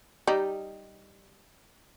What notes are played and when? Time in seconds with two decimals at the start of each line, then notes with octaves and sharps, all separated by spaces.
0.27 G3 D#4